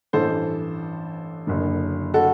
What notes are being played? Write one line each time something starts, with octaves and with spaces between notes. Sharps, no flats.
A1 G2 E3 A4 C5
F#1 F#2 D3
F#4 A4